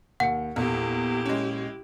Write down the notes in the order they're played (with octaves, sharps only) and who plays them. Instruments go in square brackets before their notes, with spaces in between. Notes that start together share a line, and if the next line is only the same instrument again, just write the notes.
[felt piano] D#2 C#7 [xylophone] F#5
[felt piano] A#1 A4 [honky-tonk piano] E2 [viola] E4 G4
[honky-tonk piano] G#3 C#4